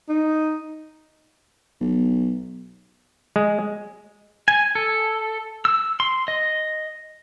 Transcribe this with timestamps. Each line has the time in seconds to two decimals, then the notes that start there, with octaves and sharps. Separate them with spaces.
0.09 D#4
1.81 B1
3.36 G#3
4.48 G#5
4.75 A4
5.65 E6
6.00 C6
6.28 D#5